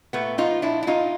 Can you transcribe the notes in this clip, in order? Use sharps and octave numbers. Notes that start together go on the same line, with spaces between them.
A#2 A3 B3
F3 D#4 F4
A#2 D4 E4
E4
A#2 D#4 F4